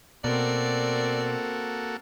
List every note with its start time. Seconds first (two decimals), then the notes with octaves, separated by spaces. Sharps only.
0.24 B2 A#3 C4 F#4 A4 A#4 D5